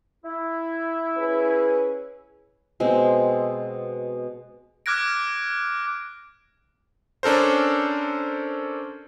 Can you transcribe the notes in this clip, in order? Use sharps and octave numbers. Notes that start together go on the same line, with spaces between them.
E4
C#4 G#4 B4
B2 G#3 C4
D6 F6 F#6 G#6 A#6 D7
C#4 D4 A4 A#4 C5